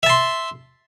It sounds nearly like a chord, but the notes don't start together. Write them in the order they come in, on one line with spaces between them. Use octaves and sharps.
E5 A5 C6